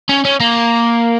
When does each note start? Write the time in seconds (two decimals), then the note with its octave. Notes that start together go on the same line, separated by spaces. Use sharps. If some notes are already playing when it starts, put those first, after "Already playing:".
0.09 C#4
0.25 C#4
0.40 A#3